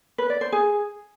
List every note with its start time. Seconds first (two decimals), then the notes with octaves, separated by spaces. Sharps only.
0.18 B4
0.30 D5
0.41 C5
0.52 G#4